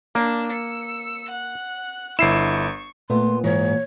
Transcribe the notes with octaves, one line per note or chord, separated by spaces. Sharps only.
A#3 D4 E7
E6 C#7
F#5 F#6
G1 E4 C#6 C7 E7
A#2 A3 B3 C6
G#2 E3 C#5